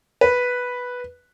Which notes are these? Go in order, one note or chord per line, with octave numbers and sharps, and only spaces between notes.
B4